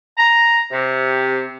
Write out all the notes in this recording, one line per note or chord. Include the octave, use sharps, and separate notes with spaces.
A#5
C3